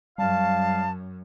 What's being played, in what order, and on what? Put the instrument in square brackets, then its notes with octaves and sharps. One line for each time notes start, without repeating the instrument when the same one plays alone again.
[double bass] F#2 [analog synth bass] G3 [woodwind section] F5 [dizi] A5